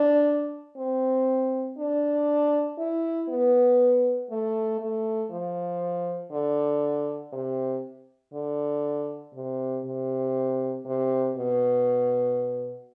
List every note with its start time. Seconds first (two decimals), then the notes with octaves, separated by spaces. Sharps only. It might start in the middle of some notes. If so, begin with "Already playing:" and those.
Already playing: D4
0.77 C4
1.78 D4
2.79 E4
3.29 B3
4.30 A3
4.80 A3
5.31 F3
6.31 D3
7.33 C3
8.33 D3
9.34 C3
9.85 C3
10.85 C3
11.36 B2